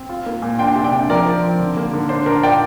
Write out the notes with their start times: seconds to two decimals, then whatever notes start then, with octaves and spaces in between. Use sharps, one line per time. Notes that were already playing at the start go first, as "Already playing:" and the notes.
Already playing: C4
0.09 F4
0.26 A#3
0.42 A#2
0.59 D4 G5 C6
0.76 C3
0.84 D5 G5
0.92 D4
1.09 F3 A#4 D5
1.26 F3
1.43 C4
1.60 D3
1.77 A#3
1.93 D3
2.09 D4 C5
2.26 D4 A#4
2.43 F4 D5 G5